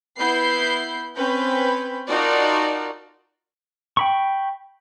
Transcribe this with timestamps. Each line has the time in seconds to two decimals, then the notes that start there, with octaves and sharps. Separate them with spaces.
0.19 B3 E4 B5 G6 C7
1.16 C4 C#4 B4 B5 G6
2.08 D#4 F4 F#4 A#4 D5 A5
3.97 G5 B5 C#6